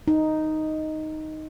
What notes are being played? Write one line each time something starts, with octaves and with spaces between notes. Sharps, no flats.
D#4